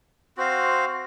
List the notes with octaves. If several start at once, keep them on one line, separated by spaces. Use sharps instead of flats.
C4 F#4 C5 F5